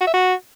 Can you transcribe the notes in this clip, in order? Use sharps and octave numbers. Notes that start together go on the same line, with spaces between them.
F#4
E5
F#4